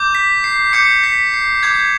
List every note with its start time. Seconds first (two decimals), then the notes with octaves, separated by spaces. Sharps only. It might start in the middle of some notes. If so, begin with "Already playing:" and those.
Already playing: D6 G6
0.15 B6
0.44 C7
0.73 D6 G6 C#7
1.03 B6
1.34 C7
1.63 D6 G6 G#6